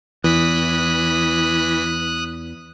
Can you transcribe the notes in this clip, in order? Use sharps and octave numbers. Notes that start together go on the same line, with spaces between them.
E2 E3 D#6 F#6 B6